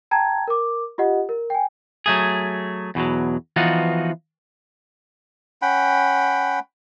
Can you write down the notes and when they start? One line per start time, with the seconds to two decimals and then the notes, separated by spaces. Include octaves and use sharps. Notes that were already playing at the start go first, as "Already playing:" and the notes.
0.11 G5 A5 A#5 G#6
0.48 A#4 D6
0.98 F4 G4 D#5 F#5
1.29 A#4
1.50 G5 G#5
2.06 F#3 A3 G#4
2.95 E2 B2 D#3 F#3
3.56 E3 F3 B3 D#4 F4 F#4
5.62 C#4 F#5 G5 B5